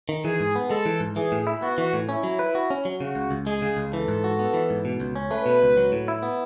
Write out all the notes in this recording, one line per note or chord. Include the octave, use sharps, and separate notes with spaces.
D#3
E3 G#4
G#2
B3
G#3 A4
E3
G#2
E3 G#4
A2
E4
B3 F#4
E3
A2
C#4 E4
F#3
B4
F#4
C#4
F#3
C#3 F#4
C#2
C#2
G#3 G#4
C#3
C#2
E3 A4
G#2
F#4
B3
E3
G#2
B2
C#2
C#4
A3 B4
B2
C#2
F#3
A2
E4
B3